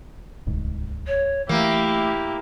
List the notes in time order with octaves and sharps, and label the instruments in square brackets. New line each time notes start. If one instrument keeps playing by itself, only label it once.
[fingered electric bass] D1 C2 G#2
[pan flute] C#5
[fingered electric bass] E3 [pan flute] A3 [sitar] A#3 [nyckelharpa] E4 G4